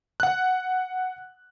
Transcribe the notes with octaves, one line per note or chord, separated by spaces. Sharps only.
F#5 F#6